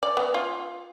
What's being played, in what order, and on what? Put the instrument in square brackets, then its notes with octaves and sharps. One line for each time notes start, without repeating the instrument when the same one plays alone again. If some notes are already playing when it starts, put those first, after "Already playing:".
[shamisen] D5
B3
F4